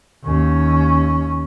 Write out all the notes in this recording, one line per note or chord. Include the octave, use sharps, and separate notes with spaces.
D#2 C#4